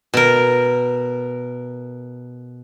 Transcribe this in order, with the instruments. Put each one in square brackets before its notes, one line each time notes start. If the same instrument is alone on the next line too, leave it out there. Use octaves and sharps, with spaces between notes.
[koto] B2 A#4